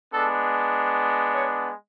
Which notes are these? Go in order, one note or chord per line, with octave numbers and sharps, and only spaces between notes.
G#3 B3 D4 A4
C#5